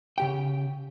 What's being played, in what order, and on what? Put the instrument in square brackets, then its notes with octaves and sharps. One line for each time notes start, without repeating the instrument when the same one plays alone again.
[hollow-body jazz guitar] C#3 G4 G5